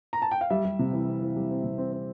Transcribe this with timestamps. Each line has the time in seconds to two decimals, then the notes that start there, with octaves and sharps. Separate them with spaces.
0.13 A#5
0.22 A5
0.31 G5
0.41 F5
0.50 G3 E5
0.65 G3
0.79 C3
0.93 E3
1.07 C4
1.22 E3
1.36 G3
1.51 C4
1.64 C3
1.78 C4
1.93 C4